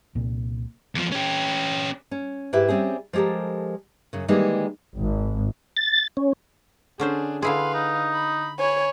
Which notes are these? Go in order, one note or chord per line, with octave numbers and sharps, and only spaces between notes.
C2 A#2
E2 F3
C#4 G4
C#4
G#2 E4 G4 B4 E5
G3 C4 C#4 G#4
F3 G#3 G4 A4 A#4
F#2 C#3
D#3 E3 G3 G#3 A#3 D#4
G#1
A6
C#4
D3 C#4 D4 G#4 C5
D3 E4 G#4 B4 F5 C6
D#4
B5
C#5 G#5 B5